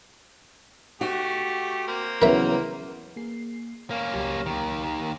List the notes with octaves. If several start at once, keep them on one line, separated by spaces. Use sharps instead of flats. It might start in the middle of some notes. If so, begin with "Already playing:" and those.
A3 F#4 G4
A#3 C4
C#3 E3 F#3 B3 A#4 E5
A#3 G#4 C7
A#3 C#4 A#4 F5
C#2 F#3 G4
D#2 D#3